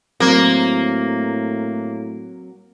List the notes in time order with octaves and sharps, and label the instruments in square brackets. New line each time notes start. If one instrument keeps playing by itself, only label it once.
[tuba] A2 [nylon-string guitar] F#3 C4 [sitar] A#3